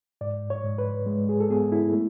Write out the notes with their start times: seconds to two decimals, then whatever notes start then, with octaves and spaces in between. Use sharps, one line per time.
0.21 G#2 D5
0.50 C#5
0.65 G#2
0.78 B4
1.06 G#3
1.29 G#4
1.40 A4
1.50 B3 G#4
1.72 E4
1.93 A3